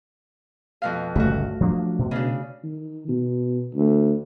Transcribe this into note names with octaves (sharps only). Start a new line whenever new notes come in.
F2 B2 F5
G1 C#2 A#2 A3 F#4
F3 F#3 D4
B2
C#3 D4
D#3
B2
D2